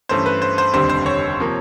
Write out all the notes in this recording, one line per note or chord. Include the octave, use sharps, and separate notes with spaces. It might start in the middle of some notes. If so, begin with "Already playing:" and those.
G2 E3 A3 C#4 C5
B4
C5
C5
F1 D#2 D3 G3 C4 C5
C5
C#5
C3 F3 A#3